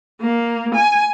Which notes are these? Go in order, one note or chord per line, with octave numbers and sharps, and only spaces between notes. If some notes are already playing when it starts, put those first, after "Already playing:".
A#3
G#5